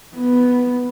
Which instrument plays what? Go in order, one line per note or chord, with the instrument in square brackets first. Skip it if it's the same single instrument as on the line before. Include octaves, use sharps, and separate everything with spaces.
[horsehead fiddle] B3